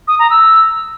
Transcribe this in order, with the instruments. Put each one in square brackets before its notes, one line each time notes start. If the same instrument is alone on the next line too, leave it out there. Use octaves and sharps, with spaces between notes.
[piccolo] D#6
A#5
E6